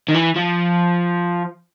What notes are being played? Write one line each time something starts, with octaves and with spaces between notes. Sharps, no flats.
D#3
E3
F3